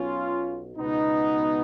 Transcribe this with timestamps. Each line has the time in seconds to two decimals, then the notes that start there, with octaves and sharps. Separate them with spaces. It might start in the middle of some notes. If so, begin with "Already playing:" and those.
Already playing: B1 B2 C#4 F4
0.76 C#2 B2 B3 D#4